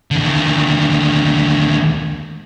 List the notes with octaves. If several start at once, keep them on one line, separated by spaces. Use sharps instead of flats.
D#2 D3